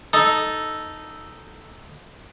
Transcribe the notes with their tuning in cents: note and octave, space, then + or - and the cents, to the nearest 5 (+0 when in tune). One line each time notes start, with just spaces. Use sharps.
D#4 +0 A4 +0